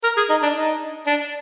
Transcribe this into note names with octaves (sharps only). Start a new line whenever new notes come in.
A#4
G#4
D#4
D4
D#4
D4